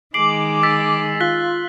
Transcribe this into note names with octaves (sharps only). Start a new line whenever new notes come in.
D#3 G#3 D6 C7 F#7
E6 A6 B6
F4 F#6 B6 G7